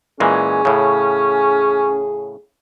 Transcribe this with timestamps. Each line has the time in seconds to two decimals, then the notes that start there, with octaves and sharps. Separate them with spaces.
0.20 A#2 E3 G#3 C#4 G#4
0.65 A2 C#3